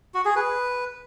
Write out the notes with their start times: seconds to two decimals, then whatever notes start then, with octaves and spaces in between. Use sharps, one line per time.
0.15 F#4
0.25 G#4
0.36 B4